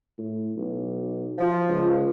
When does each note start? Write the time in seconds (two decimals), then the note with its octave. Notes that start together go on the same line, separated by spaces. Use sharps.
0.18 A2
0.57 B1
1.38 F3
1.69 C#2